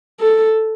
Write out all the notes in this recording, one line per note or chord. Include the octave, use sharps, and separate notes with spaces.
A4